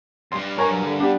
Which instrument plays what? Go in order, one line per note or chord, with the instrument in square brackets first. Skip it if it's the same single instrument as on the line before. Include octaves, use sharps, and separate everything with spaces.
[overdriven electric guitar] E2 G2 [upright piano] C6
[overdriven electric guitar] G2 [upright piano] A#4 G#5 [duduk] C#5
[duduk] F#3
D3
[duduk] B3 [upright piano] D4 G4